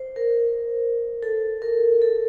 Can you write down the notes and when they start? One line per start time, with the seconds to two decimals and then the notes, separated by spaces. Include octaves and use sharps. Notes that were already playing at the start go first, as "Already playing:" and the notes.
Already playing: C5
0.16 A#4
1.23 A4
1.62 A#4
2.02 A4